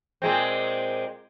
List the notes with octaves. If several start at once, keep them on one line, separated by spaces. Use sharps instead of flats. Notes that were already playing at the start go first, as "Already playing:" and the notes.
A#2 G#3 C4